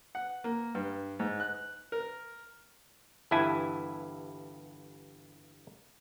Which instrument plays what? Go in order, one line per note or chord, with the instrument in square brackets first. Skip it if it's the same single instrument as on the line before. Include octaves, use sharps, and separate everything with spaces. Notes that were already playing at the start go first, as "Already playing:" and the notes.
[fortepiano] F#5
A#3
G2
G#2
F#6
A#4
[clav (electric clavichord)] G1 G2 E3 E4 G#5 A5